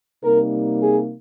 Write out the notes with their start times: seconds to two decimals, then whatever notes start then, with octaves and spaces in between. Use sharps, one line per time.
0.24 C3 G3 A#3 D#4 A#4
0.81 G#4